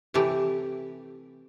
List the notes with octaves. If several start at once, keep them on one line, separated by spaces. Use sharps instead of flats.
C3 E3 A3 G4